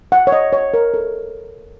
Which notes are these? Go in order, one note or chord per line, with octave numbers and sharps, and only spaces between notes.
F#5
C#5
D#5
C#5
A#4
A4